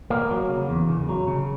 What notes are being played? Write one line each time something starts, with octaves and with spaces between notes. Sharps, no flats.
A#3
F#3
C#3
E2
C#3
F#3
C#3